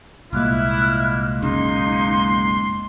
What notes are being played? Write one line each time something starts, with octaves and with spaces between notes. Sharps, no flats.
C2 A#2 G#3 A#3 E4 F6 F#6
B1 F#2 C#3 D#4 C6